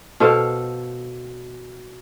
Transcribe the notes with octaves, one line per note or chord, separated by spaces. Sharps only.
B2 A4 C5 F5